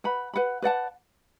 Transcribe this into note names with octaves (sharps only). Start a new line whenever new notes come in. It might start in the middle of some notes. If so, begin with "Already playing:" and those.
B4 F#5 B5
B4 F#5 B5
B4 D5 F#5 A5